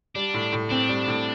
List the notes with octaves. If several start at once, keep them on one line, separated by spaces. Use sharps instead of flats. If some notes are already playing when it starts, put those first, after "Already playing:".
G3 D4
A2
A2
C4 D4
G3
A2